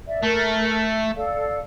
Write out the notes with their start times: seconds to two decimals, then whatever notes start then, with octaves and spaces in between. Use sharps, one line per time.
0.07 D5 E5
0.23 A3 A#4
1.14 A4 D5 F5